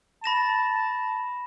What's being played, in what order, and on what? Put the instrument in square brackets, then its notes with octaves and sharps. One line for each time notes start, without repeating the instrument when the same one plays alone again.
[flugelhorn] A5 [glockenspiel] B5 A#6 E7